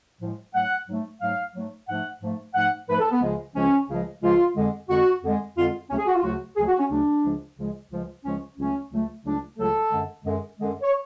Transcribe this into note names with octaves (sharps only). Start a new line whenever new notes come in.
A2 F3 G#3
G#2 F#3 A3 F#5
G#2 F#3 A3
G#2 F#3 A3 F5
G#2 F#3 A3
G#2 F3 A3 F#5
G#2 F3 A3
G#2 F3 A3 F#5
G#2 F3 A3 B4
A4
B3
C#2 C#3 F3 G#3
C#2 C#3 F3 G#3 C#4
C#2 C#3 F3 G#3
C#2 C#3 F3 G#3 F4
F2 D3 G#3
F2 D3 G#3 F#4
F2 D3 G#3
F2 D3 G#3 F4
D2 C#3 F#3 A3 C#4
G#4
F#4
F4
D2 C#3 F#3 A3 F#4
D2 C#3 F#3 A3 G#4
F#4
C#4
D2 C#3 F#3 A3 D4
C#2 C#3 F3 G#3
C#2 C#3 F3 G#3
C#2 C#3 F3 G#3
C#2 C#3 F3 G#3 C#4
C#2 C#3 F#3 A3 C#4
C#2 C#3 F#3 A3
C#2 C#3 F#3 A3 D4
C#2 C#3 F#3 A3 A4
F#2 D3 G#3
F#2 D3 G#3
F#2 D3 G#3
C#5